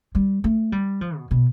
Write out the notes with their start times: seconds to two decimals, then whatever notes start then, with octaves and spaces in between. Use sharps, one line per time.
0.15 G3
0.44 A3
0.72 G3
1.01 F3
1.17 B2
1.31 B2